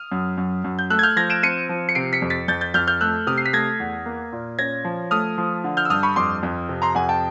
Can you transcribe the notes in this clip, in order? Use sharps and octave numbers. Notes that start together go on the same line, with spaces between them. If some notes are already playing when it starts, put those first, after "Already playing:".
Already playing: D#6 F6
F#2
F#2
F#2
G6
A3 E6 F#6
G#6
F6 G6
F3 G#6 A#6
D7 E7
C4 C#7 D#7
F3
C#7
C3 C7 D7
B6 C#7
F2
A6 B6
F2 G6 A6
G6 A6
F2 F6 G6
F6 G6
A3 E6 F#6
C3 D#6 F6
C7
B6
A3 G#6 A#6
E2
A#3
A#2
C#4 G#6 A#6
F3
A3 D#6 F6
F3
D3
F6 G6
E6
G2 D#6 F6
B5 C#6
F2 C6 D6
F2
C3
A#5 C6
F2 F#5 G#5
G5 A5